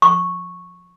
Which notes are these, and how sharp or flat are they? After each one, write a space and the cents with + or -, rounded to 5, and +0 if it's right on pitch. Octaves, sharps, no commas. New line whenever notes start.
C#6 -5